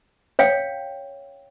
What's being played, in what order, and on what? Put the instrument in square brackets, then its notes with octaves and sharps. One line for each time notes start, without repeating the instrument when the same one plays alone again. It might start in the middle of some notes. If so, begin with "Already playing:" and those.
[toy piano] C#5 F5 G5